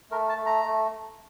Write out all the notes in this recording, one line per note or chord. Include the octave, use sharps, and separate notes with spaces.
A3 A#4
A5
A3
A#5
A3